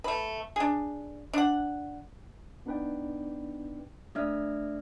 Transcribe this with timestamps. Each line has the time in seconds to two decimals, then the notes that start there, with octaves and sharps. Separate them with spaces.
0.04 A3 B4
0.56 D4 G#4
1.33 D4 F#5
2.66 B3 D4 D#4 B4 D5 G5
4.15 A3 D4 D5 E5 F6